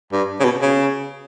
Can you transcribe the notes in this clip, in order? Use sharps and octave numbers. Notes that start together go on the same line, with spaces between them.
G2
C#3
B2
C#3